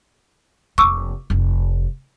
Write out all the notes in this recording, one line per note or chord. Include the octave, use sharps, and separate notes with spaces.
F1 A#3 C#6 D6 E6
F1 F3